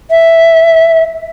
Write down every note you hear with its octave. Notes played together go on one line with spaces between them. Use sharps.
E5